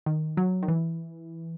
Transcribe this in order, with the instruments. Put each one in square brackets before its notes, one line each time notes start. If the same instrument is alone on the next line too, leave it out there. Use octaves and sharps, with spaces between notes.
[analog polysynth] D#3
F#3
D#3
E3